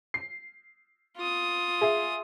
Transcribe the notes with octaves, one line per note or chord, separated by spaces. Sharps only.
C7
F4 D#6
G#4 E5